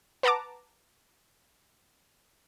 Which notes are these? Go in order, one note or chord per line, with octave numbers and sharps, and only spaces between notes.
B4 F#5 A5 A#5 D6